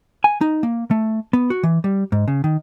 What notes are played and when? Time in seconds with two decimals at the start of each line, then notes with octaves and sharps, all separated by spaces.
0.24 G#5
0.41 D#4
0.63 A#3
0.91 A3
1.33 B3
1.50 F#4
1.63 E3
1.84 G3
2.12 G#2
2.28 C#3
2.44 D#3